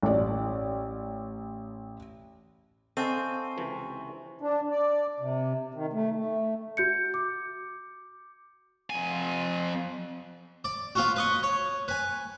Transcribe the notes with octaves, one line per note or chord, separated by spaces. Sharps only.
A1 D5
C4 A4 D#5 F5 G#5 C#6 D#7
C#2 C3 E3
D4
D5
C3
D#3
A3
A3
F#4 G6 C#7
D6
F2 G#5
D5
B3 F4 F#4
B4 D#5 C#6
C#5
B4 G#5